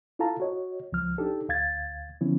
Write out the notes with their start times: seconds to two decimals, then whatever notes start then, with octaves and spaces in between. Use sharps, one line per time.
0.19 E4 F4 A4 F5 A5 A#5
0.40 F#4 C#5 D#5
0.92 C#2 F3 F6
1.18 D4 D#4 G4 A4
1.49 D2 F5 G#6 A6
2.21 D3 F3 B3 C#4 E4